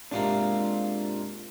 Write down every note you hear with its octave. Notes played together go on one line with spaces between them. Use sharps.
G#2 C3 A#3 D4 F4 A#4